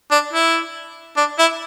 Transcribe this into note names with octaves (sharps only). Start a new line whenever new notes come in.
D4
E4
D4
E4